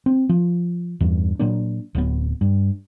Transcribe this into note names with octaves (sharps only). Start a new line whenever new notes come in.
C4
F3
E2 G2
A#2 F#3 A#3 D4
D1 F#3 B3
G2